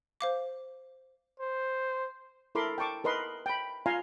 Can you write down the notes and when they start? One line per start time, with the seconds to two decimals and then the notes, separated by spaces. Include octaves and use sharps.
0.21 C5 F5 D6
1.40 C5
2.55 E4 A4 A#4 B5 C6 D6
2.78 G5 A5 C#6 D6
3.04 A#4 B4 D#5 C6
3.46 G5 B5
3.86 F4 F5 G#5 A#5 C6